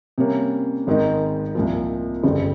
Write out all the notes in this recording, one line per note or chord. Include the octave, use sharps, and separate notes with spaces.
C3 G3 A#3 C#4
G#1 G#2 D#3 G#3 D#4
C2 A#2 F3
G1 F2 C#3 G3 C4